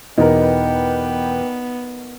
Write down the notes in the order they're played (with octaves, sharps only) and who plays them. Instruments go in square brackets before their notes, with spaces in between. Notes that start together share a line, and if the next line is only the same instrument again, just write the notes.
[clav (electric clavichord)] E2 B2 [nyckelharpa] B3 [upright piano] D#4 A#4 [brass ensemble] B4 D5 G5